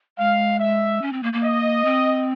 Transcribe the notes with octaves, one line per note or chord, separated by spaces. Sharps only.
G#3 F5
E5
C#4
C4
A#3
A#3
D#5
C4